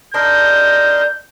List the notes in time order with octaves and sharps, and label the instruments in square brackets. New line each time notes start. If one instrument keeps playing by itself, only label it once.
[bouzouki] D4 D#4 [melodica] A#4 D#5 C6 [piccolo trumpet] G6